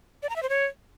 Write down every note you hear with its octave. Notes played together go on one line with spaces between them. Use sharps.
D5
A#5
E5
C5
C#5